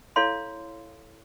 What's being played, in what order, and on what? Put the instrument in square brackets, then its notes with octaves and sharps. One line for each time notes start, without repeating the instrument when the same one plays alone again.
[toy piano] E4 A4 C#5 F5 C6